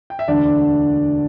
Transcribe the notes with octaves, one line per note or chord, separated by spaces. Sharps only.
G5
E5
E1 D2 D3 D4 D5